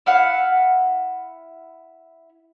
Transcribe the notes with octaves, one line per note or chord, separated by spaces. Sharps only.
E4 F5 F#5